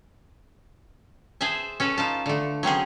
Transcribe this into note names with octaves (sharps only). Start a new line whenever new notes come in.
G#4 C5 E5 A5
C#4 A4 B4
D#4 F4 A5
D3 A3
F#3 C4 C#4 G#4